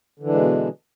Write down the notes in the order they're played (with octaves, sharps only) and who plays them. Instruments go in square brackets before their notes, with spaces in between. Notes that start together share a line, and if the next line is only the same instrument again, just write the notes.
[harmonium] D3
E3
D4
G#3
B2